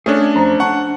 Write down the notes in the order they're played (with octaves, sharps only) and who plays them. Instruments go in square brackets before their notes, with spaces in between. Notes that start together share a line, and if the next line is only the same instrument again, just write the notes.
[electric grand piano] A3 C#4 D4 [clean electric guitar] G#4 C#5
[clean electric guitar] F2 C5 A#5
[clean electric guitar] D4 A5 [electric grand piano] F#5 C#6